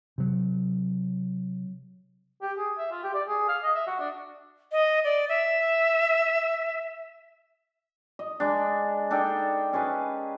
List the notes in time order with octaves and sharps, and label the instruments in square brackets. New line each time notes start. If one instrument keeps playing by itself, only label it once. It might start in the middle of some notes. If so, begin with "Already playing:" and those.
[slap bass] C3 F#3
[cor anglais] G4
G#4
E5
F4
G4
D5
G#4
F5
D#5
E5
F#4
D4
[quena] D#5
D5
E5
[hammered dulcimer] D#5
G#3 D4
D4 D#4 A4 G5
C#4 G#4 B4